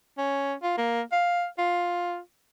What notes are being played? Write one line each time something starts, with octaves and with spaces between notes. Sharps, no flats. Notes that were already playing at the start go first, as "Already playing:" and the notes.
C#4
F4
A#3
F5
F4